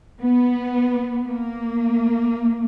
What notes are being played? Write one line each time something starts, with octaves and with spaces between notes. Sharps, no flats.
B3
A#3